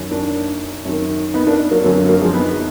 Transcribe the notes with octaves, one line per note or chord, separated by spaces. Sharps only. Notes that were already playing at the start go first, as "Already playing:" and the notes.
Already playing: F#2 D#3
A#3 D4
F#2 D#3
B3 D#4
A#3 D4
F#3 A#3
F#2 D3 F#3 A#3
F#3 A#3
F#3 A#3
F3 G#3
B3 D#4